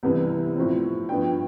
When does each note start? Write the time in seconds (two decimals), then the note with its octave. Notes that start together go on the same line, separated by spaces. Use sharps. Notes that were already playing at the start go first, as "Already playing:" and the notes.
0.03 C2 C3 E3 B3
0.56 A2 F3 C4
1.09 G2 F3 B3 G5